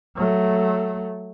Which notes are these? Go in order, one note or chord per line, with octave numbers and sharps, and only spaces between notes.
F#3 A3